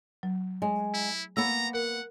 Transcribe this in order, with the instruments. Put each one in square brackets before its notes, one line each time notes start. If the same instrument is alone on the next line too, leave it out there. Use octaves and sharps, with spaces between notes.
[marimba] F#3
[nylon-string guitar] G#3
[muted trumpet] E4
[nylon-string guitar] A#3 B3 [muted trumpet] A#5 [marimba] E6
[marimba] A#4 [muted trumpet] F#5